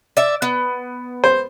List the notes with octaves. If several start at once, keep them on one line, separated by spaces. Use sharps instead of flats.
D5 E5
B3
C5